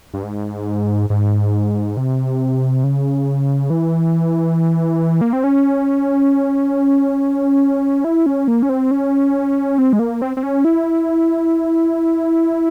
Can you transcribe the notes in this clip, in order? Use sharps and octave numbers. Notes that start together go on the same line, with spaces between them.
G2
G#2
G#2
C3
C#3
E3
A#3
C4
C#4
E4
C#4
A#3
C#4
C4
C#4
C4
G#3
A#3
C4
C4
C#4
E4